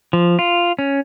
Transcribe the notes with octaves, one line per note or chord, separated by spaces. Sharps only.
F3
F4
C#4